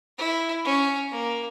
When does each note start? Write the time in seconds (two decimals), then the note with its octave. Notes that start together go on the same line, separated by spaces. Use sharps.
0.18 E4
0.65 C#4
1.11 A#3